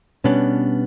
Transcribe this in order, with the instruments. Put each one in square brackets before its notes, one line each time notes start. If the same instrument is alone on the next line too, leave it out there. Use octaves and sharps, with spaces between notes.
[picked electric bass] B2 G3 B3 D4 [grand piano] C#4